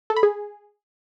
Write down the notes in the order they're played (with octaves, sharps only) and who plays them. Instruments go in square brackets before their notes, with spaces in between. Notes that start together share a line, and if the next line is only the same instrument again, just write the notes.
[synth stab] A4
B5
G#4